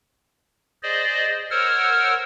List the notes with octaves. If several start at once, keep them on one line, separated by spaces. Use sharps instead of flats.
G#4 C5 D5 D#5
A#4 C5 C#5 F#5 E6 F6